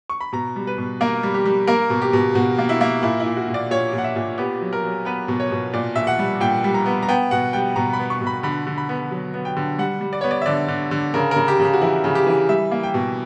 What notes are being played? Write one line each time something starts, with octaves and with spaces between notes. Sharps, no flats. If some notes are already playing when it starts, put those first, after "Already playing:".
C#6
B5
B2 A#5
G3
B4
B2
A#3 A#4
G3
G4
G3
A#3 A#4
B2
G4
B2
B2 F#4
A#3
E4
A#3
A#2 E4
E4
A#2
F#4
A#2
D5
A#2 C#5
A#2
F#5
E5
A#2
B3 G4
F#3
A#4
F#3
B3 B4
B2
C#5
B2
A#2 D5
A#2 E5
F#5
G3
A#2 G5
G3
A#5
B3
A#5
B3 G5
B2 F#5
G3 G5
B2 A#5
B5
B3
C#6
B2
B5
D3 B5
D3
B5
B3
F#3
B3
G5
D3
G3 F#5
G3
D5
B3 C#5
D5
E5
D3 D5
D3
D3
C#3 A#4
C#3 A#4
G4
C#3
G4
F#4
E3 E4
C#3
G4
E3
G3 E5
A#3
G5
B2